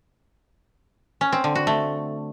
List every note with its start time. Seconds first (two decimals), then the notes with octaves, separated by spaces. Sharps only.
1.21 C#4
1.32 C4
1.44 D3
1.55 F#4
1.67 A3